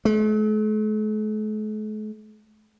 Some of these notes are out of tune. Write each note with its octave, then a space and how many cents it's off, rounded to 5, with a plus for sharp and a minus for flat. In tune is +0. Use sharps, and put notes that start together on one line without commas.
A3 -45